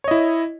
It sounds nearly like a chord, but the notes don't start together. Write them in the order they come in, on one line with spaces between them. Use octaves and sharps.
C#5 D#5 E4